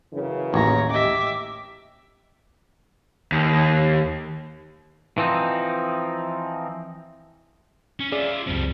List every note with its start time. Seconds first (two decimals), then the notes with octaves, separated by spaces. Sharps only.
0.14 F#2 C#3 E3
0.54 A1 D#2 C#5 A#5
0.90 G4 D#5 E5 D6
3.32 D#2
5.18 E3 F3 C4 D#4
8.00 C#4
8.12 C#4 F4 G#4 D5 E5
8.47 C#2 F#2 F3 G3 C4